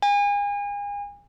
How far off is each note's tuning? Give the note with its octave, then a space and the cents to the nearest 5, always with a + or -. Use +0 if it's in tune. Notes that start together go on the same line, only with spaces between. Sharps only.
G#5 -35